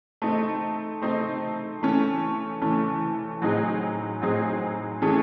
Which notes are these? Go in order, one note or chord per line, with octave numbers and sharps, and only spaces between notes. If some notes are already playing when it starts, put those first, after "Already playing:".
A3 C4 D#4
A3 C4 D#4
E3 A3 C#4
E3 A3 C#4
A2 F#3 C4 D#4 G#4
A2 F#3 C4 D#4 G#4
E3 A3 C#4 G#4